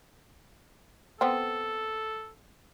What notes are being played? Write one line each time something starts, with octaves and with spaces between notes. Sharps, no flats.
B3 C4 A4